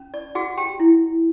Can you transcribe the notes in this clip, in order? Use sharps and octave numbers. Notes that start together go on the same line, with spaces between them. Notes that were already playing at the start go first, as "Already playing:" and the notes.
Already playing: C#4
D5
F#4 G#4 F#5
G4 G5
E4